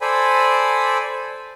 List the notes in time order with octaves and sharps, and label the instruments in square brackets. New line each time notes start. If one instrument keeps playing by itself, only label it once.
[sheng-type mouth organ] A4 C5 D5 G#5 B5